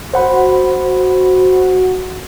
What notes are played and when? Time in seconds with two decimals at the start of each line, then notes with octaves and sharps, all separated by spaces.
0.14 F#4 C5 F#5 B5